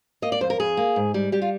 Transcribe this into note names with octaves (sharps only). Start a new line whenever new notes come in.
A#3 D#5
D5
F2 C5
A#4
F2 G#4
A#3
G#2
G3
G3 G4
F4